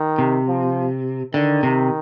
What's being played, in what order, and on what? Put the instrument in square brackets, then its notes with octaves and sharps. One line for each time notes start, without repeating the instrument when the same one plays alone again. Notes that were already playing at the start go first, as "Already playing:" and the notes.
Already playing: [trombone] D#3
[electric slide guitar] C3
[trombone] F3
[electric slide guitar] D3 [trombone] D#3
[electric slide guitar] C3